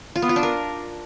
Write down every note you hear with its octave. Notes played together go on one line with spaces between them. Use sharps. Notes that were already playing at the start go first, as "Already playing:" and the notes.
F4
B3
F4
D4
A#4